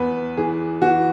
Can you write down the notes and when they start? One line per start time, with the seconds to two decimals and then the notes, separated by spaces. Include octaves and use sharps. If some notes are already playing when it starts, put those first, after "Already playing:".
Already playing: E2 B3 B4
0.37 E3 G#4
0.81 E3 F#4